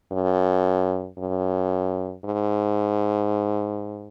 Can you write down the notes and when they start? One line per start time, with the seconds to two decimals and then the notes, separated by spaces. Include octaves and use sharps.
0.12 F#2
1.18 F#2
2.25 G#2